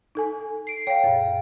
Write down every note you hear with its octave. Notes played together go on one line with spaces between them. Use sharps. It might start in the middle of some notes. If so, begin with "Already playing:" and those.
D#4 A4 G#5
C7 D7
C#5 F5 G5
F#2 A#2